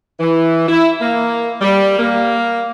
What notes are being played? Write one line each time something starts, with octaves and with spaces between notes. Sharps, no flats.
E3
E4
A#3
G3
A#3